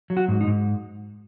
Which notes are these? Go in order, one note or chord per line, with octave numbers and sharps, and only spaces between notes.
F#3
F#4
G#2
D#4
G#2